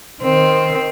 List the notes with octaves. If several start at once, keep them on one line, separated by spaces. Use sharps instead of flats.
D#3 C4